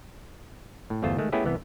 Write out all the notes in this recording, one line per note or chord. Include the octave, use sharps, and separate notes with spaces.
A2
G1 E2 A3 F4 C5
D#3 G#3 A3
A3 B3 C#4 E4 G4 G#4
C2 E3 B3